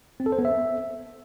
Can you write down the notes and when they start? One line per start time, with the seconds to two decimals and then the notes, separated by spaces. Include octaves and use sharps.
0.20 C4
0.26 A4
0.32 C5
0.39 B3
0.45 E5